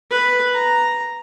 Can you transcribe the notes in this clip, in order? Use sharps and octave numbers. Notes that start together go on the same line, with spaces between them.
B4
A#5